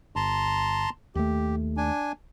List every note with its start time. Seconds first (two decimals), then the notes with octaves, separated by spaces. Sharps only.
0.16 G1 A5 A#5 C6
1.15 D#2 A3 G4
1.77 D4 G#5